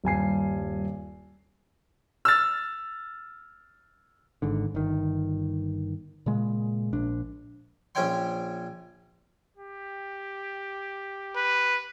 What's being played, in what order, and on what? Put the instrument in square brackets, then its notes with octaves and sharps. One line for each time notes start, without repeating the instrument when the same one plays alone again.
[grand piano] D#1 G2 G#5 C7
[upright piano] E6 F6 A6
[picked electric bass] G#1 G#2 D3
G1 D#3
A#2 C#3 G#3
A#1 D4
[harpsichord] A#1 C#4 C5 C#5 G5 C6
[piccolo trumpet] G4
[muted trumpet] B4